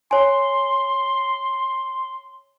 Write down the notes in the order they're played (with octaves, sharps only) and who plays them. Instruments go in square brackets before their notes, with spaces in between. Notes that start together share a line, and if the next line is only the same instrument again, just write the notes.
[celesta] C#5 G#5 [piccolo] C6